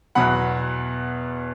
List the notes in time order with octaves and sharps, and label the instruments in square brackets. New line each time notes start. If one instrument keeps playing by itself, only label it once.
[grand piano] E2 B2 F#3 F#5 B5